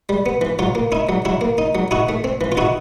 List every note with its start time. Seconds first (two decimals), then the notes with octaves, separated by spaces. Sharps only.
0.09 G3
0.26 B3
0.41 E3
0.59 F#3 F4
0.75 A#3
0.92 D#4 E4
1.09 F#3
1.25 F#3 E4
1.41 A#3
1.58 D#4
1.75 F#3
1.91 D#4 E4 F#4
2.09 A3
2.24 C4
2.41 E3
2.52 F4
2.57 D#4 E4 F#4